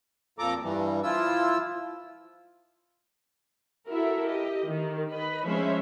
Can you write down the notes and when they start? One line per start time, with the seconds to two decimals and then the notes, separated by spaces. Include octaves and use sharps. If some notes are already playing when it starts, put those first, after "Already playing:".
0.39 F2 A#2 F3 A4 A#5 D6
0.62 G2 E3 G3
1.03 F3 E4 F4 E6
3.89 E4 F#4 A4 A#4 E5
4.23 G4 D#5
4.66 D#3
5.10 B4 D#5 B5
5.47 F3 G#3 C#4 C5 C#5 E5